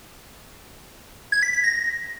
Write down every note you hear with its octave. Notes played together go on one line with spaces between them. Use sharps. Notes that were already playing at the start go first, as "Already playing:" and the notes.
G#6
B6
B6
A#6